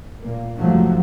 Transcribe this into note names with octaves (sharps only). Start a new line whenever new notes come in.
A#2 A#3
F#1 G#2 C3 F3 F#3 A3